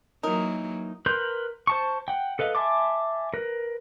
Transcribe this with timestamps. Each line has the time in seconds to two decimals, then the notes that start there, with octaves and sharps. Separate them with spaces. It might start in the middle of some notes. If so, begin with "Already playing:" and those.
0.23 E3 F#3 A#3 D#4 A#4
1.06 A#4 B4 C6 G6
1.67 C5 A5 C#6
2.08 F#5 G5
2.39 A4 B4 D#5 F5
2.55 E5 G#5 A5 C6 D6
3.34 A#4 B4